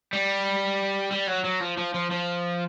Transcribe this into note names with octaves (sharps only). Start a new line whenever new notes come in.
G3
G3
F#3
F#3
F3
F3
F3
F3